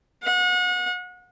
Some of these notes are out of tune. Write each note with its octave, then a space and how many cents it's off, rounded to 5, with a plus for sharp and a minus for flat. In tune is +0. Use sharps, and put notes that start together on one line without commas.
F#5 -35